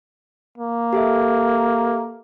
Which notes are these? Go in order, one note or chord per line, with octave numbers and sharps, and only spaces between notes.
A#3
G4 A4 E5